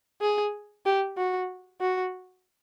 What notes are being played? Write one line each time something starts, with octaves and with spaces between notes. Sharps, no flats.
G#4
G4
F#4
F#4